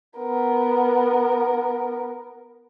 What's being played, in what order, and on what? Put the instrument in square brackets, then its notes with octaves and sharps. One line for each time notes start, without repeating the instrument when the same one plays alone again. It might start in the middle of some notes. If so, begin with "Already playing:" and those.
[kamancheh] B3 A#4